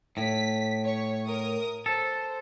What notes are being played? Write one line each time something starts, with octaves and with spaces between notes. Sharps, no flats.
A2 B6
C#5
A#4 D#6
A4 C5